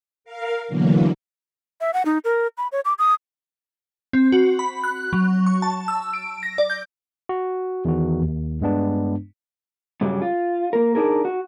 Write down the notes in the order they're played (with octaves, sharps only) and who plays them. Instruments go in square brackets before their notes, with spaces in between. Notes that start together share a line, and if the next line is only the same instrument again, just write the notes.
[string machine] A#4 F5
B2 D3 E3 F#3 A#3
[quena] E5
F#5
D#4
A#4
B5
C#5
D6
D#6
[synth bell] C4
F#4
B5
F#6
F#3
C#6
A5
E6
D7
A#6
D5
G6
[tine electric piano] F#4
E2 D#3 F#4
D#2
G2 G#3 B3 D4
[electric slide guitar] G2 C#3 F#3 G3
F4
A#3 A#4
D4 D#4 G#4 A#4
F#4